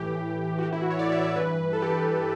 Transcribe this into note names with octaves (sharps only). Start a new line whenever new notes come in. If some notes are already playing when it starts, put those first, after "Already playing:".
Already playing: A2 E3 G4
F#4
A2 E3 G4
E4
F#4
C#5
D5
E5
D5
G2 E3 B4
A4
G4